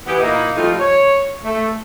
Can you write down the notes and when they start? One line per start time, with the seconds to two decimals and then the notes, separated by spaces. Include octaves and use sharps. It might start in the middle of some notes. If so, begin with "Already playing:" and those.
0.06 E3 B3 G4
0.20 A#2 A#3 D#4 E4
0.55 F3 G3 A3 C4 D#4 F4
0.79 C#5
1.43 A3